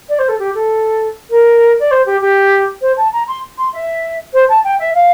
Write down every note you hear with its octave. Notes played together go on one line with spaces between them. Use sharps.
D5
C5
A4
G4
A4
A#4
D5
C5
G4
G4
C5
A5
A#5
C6
C6
E5
C5
A5
G5
E5
F5